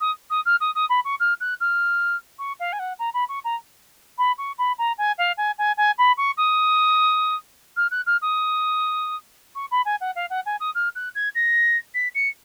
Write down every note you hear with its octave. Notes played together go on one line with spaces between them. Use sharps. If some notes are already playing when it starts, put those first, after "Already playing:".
D#6
D#6
F6
D#6
D#6
B5
C#6
F6
F#6
F6
C#6
F5
G#5
F#5
A#5
B5
C#6
A#5
B5
C#6
B5
A#5
G#5
F5
G#5
G#5
G#5
B5
C#6
D#6
F6
F#6
F6
D#6
C#6
B5
G#5
F#5
F5
F#5
G#5
D#6
F6
F#6
G#6
A#6
B6
C#7